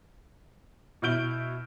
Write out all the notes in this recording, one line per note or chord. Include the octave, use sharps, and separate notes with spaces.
B2 E4 F6 G6 D7 G7